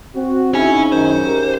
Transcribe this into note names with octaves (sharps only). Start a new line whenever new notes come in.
C4 F#4
C#3 D#4 E4 C#5 G#5
F#2 D#3 C5
G4 A#4